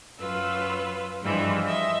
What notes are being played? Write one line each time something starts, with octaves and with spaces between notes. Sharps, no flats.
F#2 F4 B4 E6
G2 E3 F3 G#3
D#5 E5 E6